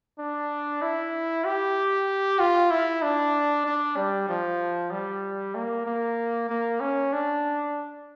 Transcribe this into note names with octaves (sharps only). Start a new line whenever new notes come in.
D4
E4
G4
F4
E4
D4
D4
G3
F3
G3
A#3
A#3
A#3
C#4
D4